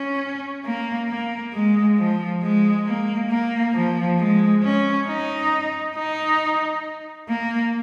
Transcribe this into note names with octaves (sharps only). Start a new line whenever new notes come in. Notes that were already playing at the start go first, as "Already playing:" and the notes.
Already playing: C#4
A#3
A#3
G#3
F3
G#3
A#3
A#3
F3
G#3
C#4
D#4
D#4
A#3